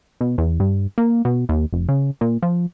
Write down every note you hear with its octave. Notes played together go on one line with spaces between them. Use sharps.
B2
E2
G2
A#3
B2
D#2
F1
C#3
A#2
F3